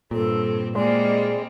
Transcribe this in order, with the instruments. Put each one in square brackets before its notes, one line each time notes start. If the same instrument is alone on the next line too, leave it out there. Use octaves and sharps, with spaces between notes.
[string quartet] G2 C4 [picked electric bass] A#2 [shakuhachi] A4
[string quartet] G3 A#3 C4 [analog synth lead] G#3 [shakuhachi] D5